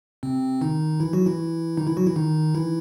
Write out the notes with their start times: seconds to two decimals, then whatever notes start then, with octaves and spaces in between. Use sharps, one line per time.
0.23 C3 C4
0.61 D#3 D#4
1.00 E3 E4
1.13 F#3 F#4
1.26 E3 E4
1.77 D#3 D#4
1.87 E3 E4
1.97 F#3 F#4
2.06 E3 E4
2.16 D#3 D#4
2.55 E3 E4